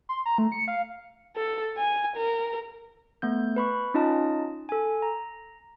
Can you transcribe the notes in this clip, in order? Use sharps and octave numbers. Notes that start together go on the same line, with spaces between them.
C6
A#5
A3
C#7
F5
A4
G#5
A#4
A3 B3 G6
B4 B5 C#6
C#4 D#4 F4 D#5 A5
A4 G#5
A#5